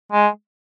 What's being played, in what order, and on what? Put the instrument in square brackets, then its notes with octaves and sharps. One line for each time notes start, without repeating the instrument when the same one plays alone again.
[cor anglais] G#3